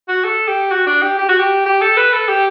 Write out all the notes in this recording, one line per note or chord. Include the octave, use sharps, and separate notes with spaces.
F#4
A4
G4
F#4
D4
G4
G4
F#4
G4
G4
A4
B4
A4
G4